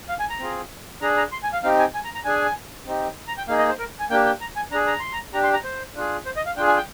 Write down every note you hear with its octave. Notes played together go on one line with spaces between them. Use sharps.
F5
G#5
A#5
C4 F4 G#4
D4 G#4 A#5
A#5
C6
G#5
F5
C4 D#4 G4 F5
G#5
G#5
A#5
A#5
D4 G#4 G#5
C4 D#4 G4
A#5
G5
A#3 D#4 G#4 F5
D#5
C5
A#4
G#5
A#3 D4 G4 G5
G5
A#5
G#5
D4 G#4 A#5
A#5
C6
A#5
D4 G4 A#5
C6
A#5
C5
D4 F4 G#4
C5
D#5
F5
D4 F4 G#4 G5
G#5
G5